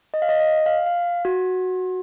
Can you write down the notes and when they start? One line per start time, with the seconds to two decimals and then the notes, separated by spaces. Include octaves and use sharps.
0.14 D#5
0.22 F5
0.29 D#5
0.40 D#5
0.66 F5
0.86 F5
1.25 F#4